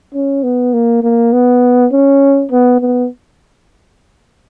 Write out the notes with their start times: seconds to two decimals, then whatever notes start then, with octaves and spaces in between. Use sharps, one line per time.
0.14 C#4
0.44 B3
0.73 A#3
1.03 A#3
1.33 B3
1.92 C#4
2.52 B3
2.81 B3